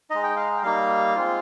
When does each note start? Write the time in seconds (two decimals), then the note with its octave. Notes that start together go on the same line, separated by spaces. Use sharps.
0.10 G#3 D#4 D#5
0.23 G5
0.36 F5
0.57 G5
0.63 G3 A#3 D#4 F5
1.15 G#3 C4 F4